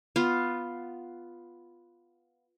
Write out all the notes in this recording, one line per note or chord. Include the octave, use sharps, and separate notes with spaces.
B3 F4